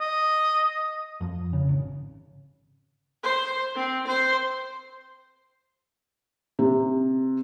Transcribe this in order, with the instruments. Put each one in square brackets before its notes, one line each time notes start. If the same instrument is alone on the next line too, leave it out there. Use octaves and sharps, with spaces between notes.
[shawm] D#5
[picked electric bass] F2
C#3
G#1
[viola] C5
C4
C5
[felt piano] C3